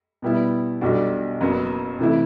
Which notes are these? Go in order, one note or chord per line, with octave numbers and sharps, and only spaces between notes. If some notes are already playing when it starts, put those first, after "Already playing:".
B2 G3 B3 E4
B1 B2 G3 D4 F#4
F#1 F#2 F#3 B3
C3 E3 A3 E4